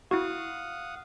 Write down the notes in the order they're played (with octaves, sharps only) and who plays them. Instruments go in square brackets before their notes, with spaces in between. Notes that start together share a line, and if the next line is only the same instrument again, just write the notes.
[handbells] E4 F#4 [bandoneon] F5 F#5 D#6